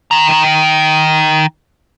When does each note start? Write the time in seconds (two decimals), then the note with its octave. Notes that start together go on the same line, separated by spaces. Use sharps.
0.11 D#3 A#5